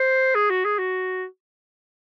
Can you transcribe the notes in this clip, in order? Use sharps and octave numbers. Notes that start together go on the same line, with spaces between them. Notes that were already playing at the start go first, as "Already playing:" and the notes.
Already playing: C5
G#4
F#4
G#4
F#4